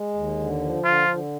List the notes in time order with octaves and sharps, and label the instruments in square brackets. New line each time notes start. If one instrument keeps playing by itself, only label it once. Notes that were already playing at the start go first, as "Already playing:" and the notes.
Already playing: [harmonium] G#3
D#2
D3
F3
[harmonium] D3 [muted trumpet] F4
[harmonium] D3